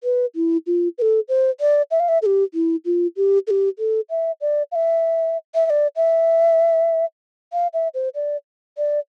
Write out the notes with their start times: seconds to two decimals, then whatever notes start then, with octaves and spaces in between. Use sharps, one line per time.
0.04 B4
0.35 E4
0.67 F4
0.98 B4
1.02 A4
1.29 C5
1.60 D5
1.91 E5
2.00 F5
2.09 E5
2.22 A4
2.26 G4
2.54 E4
2.85 F4
3.17 G4
3.47 A4
3.51 G4
3.79 A4
4.10 E5
4.41 D5
4.72 F5
4.75 E5
5.55 E5
5.66 E5
5.70 D5
5.96 E5
7.53 F5
7.74 E5
7.94 C5
8.15 D5
8.78 D5